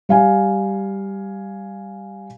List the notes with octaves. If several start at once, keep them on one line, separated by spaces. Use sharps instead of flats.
G3 F5 G#5